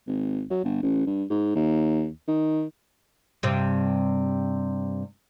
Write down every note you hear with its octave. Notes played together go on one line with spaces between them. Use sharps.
G#1
F#3
G1
A1
G2
G#2
D#2
D#3
G2 C3